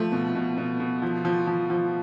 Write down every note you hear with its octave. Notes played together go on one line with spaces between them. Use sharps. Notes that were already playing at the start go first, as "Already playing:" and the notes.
Already playing: F3 A3
B2
B2
B2
B2
F3
F3
F3
F3